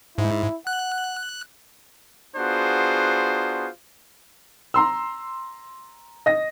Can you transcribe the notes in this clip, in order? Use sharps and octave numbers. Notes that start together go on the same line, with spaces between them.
G#2 E4
F#5 F#6
B3 D4 F4 F#4 G#4 C5
A#5 C6 E6
D#5 A#6